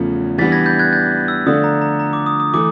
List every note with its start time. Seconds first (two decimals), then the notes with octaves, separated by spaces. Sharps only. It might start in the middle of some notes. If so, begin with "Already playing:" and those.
Already playing: E2 C#3 F3 A3
0.38 E3 G3 B3 D4 A6 B6
0.52 G#6 A#6
0.66 G6 A6
0.79 F#6 G#6
0.93 G6 A6
1.28 E6
1.46 D3 F3 A3 D4 F4 D#6
1.64 A#5
1.81 A#5
2.00 A#5
2.13 D6
2.26 D#6
2.40 D#6
2.54 E3 A3 D6